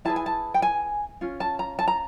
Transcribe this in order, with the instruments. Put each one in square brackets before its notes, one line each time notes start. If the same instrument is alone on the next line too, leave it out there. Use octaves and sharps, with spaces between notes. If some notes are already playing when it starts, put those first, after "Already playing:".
[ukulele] E4 G#4 B4 A5
G#5
A5
G5
G#5
C#4 F4
A5
A#5
A5
A#5